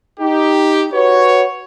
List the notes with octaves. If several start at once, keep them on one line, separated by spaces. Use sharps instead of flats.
D#4 G4
F#4 B4 C#5